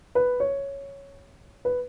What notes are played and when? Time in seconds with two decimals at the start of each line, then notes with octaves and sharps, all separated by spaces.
0.15 B4
0.40 C#5
1.65 B4